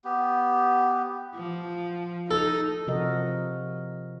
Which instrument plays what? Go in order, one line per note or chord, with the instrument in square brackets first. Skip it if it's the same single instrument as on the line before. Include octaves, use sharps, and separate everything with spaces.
[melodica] B3 G4
[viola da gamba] F3
[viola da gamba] D#4 [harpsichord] A4
[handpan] C3 F3 F#4 A#4 D#5